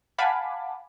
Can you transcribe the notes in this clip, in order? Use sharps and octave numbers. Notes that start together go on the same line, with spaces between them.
F5 F#5 G#5 A5 B5 D6